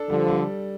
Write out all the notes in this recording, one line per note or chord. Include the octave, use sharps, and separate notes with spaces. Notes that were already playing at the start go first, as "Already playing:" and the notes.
Already playing: D4 A4
D3 F3 G3
G3